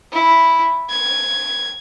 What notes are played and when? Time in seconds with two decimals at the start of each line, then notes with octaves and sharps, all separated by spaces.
0.13 E4
0.90 G#6